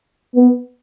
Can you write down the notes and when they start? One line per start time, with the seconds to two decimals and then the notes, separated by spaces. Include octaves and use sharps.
0.36 B3